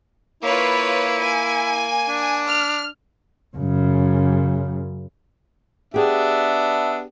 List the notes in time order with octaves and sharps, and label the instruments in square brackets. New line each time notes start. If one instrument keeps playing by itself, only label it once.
[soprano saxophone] A#3 [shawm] E4 [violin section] F4 B4 C#5
[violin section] G#5
[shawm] D4
[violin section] F6
[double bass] F#2 C#3
[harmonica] B3 D4 [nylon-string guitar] G4 G#4 [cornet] E5